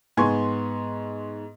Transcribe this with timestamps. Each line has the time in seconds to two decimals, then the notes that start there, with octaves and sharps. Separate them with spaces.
0.17 G#2 B3 G#5 C6 C#6 G#6